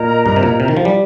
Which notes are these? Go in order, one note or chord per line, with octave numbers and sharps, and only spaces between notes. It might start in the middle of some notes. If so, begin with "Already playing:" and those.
Already playing: A#2 A#4 D#5 A#5
G2
C3
A#2
C3
D#3
F3
G3